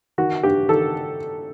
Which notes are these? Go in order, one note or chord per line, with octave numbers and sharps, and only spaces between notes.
D#3 F#4
G2 G4
D#3 A4